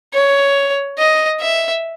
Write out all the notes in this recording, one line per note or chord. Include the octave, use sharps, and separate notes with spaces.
C#5
D#5
E5